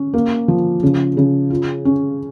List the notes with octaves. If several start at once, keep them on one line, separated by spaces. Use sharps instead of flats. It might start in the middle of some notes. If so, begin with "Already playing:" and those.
Already playing: C#4
A#3
F3
C#3
C#3
F4
C#4